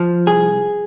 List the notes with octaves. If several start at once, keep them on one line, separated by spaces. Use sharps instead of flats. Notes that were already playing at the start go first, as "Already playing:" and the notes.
Already playing: F3
C2 G#4